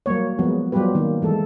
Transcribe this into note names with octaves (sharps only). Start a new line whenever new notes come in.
F#3 G3 A#3 C#5
F3 F#3 G#3 B3 F#4
F#3 G3 B3 F4 G4 B4
D#3 F#3 A#3
E3 G#3 A4